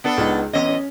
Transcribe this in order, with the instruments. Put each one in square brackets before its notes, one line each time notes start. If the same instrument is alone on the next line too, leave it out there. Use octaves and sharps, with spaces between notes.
[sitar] B3 D4 A4
[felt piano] C#2 D#4
[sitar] E2 G#3 D#5 [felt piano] C#4
[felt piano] C#4